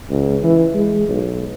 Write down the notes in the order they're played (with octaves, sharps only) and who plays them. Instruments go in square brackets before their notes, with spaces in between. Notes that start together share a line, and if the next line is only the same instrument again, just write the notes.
[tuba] C#2
E3
G#3
B1